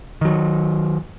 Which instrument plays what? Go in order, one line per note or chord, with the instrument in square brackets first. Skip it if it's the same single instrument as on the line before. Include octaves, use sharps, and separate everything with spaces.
[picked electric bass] D#3 F#3